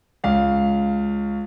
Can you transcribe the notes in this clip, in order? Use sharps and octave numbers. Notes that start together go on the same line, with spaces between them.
C#2 F5